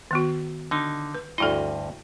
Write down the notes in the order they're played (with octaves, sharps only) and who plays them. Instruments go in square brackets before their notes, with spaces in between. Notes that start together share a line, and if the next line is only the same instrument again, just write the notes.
[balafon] D#3 B3 F#4
[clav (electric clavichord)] D3 D#4
[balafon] B4
[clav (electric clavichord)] D2 G2 D#5 [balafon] E4 F#4 A4